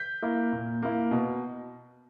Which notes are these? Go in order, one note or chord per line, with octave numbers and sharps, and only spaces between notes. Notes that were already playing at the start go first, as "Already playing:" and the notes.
Already playing: G6 B6
A#3 E4
A#2
A#3 E4
B2